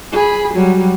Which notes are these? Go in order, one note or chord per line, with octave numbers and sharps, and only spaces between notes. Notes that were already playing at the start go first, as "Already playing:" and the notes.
G#4 B5
F#3 G3